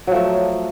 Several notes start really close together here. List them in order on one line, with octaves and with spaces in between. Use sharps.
F#3 F3 A3